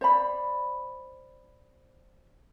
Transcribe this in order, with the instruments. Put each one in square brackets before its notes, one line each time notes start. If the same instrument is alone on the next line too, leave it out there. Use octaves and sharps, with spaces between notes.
[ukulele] C5 D5 B5